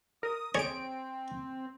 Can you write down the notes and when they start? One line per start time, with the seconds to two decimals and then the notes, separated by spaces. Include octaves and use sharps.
0.23 A#4 D#6
0.55 C4 G#4 C#5 D7